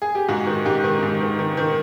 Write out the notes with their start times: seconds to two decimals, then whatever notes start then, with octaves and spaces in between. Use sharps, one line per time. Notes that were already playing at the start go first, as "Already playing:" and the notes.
0.02 G#4
0.15 G4
0.29 G#2 F#4
0.47 D#3
0.65 G#2 G4
0.84 D#3
1.03 G#2
1.21 D#3
1.39 D#3
1.57 D#3